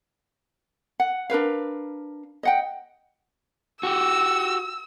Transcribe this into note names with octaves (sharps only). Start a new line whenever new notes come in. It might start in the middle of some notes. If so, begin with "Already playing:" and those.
F#5
D4 A#4 B4 F5
D#5 F#5 G5
F#4 G4 E6